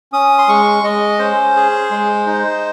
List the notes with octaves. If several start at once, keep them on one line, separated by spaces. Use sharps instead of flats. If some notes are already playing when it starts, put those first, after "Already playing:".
C#4 D#6
C6
G#3 C#6
G#3 D#5
C#4 C5
G#4
G#3
D#4